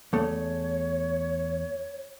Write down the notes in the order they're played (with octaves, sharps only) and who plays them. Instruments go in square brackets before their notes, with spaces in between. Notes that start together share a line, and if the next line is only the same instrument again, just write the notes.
[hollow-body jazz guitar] E2 A3 [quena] C#5